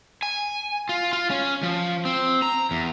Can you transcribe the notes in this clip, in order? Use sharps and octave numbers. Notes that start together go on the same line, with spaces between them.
G#5
F4
F4
C#4
F3
C4
A#5
E2